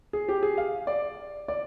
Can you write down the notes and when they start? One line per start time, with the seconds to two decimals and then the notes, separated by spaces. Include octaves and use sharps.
0.13 G#4
0.29 G4
0.43 G#4
0.58 F5
0.87 D5
1.48 D5